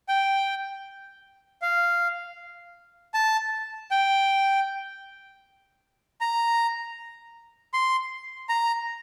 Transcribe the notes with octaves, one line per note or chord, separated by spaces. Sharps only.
G5
F5
A5
G5
A#5
C6
A#5